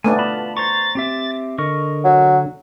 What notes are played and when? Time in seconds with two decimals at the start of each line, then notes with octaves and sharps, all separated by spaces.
0.04 A3 B3 D4 G#5
0.19 F4 A5 B5
0.57 C5 A#5 C#6 A6
0.95 C4 G4 E5
1.58 D3 A#4 D#5 C#6
2.05 F#3